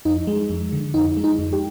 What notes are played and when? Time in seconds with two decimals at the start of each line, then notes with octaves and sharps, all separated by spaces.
0.05 F2 D#4
0.27 G#3
0.50 F2
0.72 D3
0.94 F2 D#4
1.17 G#3
1.24 D#4
1.38 F2
1.53 G4